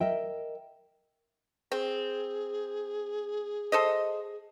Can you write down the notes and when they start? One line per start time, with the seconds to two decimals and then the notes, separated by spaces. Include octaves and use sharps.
0.01 A#4 D#5 E5 G5
1.72 C4 G#4
3.72 A4 C5 D#5